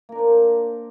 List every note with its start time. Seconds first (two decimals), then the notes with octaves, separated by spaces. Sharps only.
0.09 A#3
0.12 A#4
0.15 D4
0.19 C5